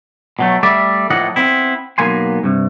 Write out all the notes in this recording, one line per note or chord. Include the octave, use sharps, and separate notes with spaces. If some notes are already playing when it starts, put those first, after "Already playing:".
B2 F#3 A3
G3 A3 D5 E5
A2 F3 A#3 A4 D#5 F#5
B3 C4 E4
B1 A#3 B3 G#5 C6
G2 C3